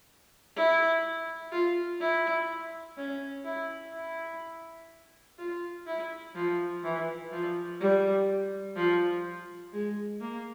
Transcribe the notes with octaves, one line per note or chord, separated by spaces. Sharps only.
E4
F4
E4
C#4
E4
E4
F4
E4
F3
E3
F3
G3
F3
G#3
A#3